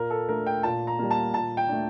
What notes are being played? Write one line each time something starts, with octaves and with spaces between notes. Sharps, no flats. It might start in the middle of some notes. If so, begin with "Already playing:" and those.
Already playing: A#2 A#4
A4
A3 D4 A#4
G5
A#2 A5
A#5
G3 A#3
A5
A#2 A5
G5
A3 D4